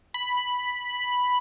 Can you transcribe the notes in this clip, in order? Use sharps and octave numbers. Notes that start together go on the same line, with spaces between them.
B5